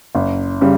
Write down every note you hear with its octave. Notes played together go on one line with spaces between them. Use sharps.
F#1
C#3 G3